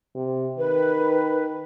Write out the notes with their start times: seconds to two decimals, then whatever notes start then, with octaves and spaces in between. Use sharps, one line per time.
0.15 C3
0.58 D#3 B4